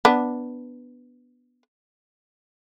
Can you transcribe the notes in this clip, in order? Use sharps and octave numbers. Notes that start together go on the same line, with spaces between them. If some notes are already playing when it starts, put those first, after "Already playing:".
B3 D4